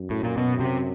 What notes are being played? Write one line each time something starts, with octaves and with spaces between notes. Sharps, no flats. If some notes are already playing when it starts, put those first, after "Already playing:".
Already playing: F#2
A2
A#2
B2
C3